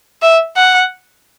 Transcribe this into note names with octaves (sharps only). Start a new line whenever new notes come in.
E5
F#5